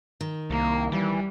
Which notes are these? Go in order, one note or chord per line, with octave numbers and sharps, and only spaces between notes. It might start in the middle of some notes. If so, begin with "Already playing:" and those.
D#3
C2 A#3
E3 G3